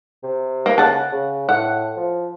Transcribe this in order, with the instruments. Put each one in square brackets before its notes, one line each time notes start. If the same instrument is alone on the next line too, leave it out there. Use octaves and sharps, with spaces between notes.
[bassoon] C3
[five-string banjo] A#3
[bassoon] C#3 [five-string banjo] F#5 A5
[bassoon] C#3
[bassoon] A2 [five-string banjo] F#5
[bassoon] F3